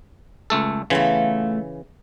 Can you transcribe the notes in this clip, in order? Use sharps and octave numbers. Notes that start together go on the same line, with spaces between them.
C#2 A3 A4
C#3 E3 A3 B3 F4